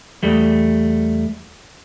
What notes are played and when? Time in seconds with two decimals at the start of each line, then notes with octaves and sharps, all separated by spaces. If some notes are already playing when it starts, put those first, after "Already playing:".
0.23 E2 G3 A3